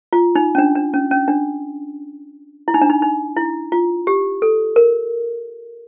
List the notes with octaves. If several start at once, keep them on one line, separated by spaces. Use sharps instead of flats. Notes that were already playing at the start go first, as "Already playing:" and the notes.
F4
D#4
C#4
D4
D4
C#4
C#4
D4
E4
D#4
D4
D#4
D#4
E4
F4
G4
A4
A#4